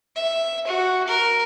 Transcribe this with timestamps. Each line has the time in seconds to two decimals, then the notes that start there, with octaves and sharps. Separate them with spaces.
0.16 E5
0.67 F#4
1.08 A#4